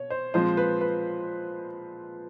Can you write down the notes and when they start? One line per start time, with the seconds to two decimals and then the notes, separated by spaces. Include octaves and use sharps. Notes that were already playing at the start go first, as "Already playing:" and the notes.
Already playing: B2 C#5
0.10 C5
0.34 A#2 F3 G#3 C4 C5
0.57 B4
0.81 B4